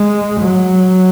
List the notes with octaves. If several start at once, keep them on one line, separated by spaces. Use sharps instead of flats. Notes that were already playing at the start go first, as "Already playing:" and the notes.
Already playing: G#3
F#3